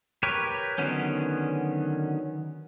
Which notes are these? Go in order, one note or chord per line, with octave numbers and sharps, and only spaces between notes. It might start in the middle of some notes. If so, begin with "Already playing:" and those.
G4 A#4 B4 C#5
D3 D#3 F#3 B3 C#4